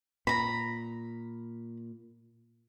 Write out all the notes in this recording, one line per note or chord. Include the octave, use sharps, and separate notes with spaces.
A#2 A#5 B5